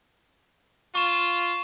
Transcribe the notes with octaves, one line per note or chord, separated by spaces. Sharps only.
F4 C#6 E7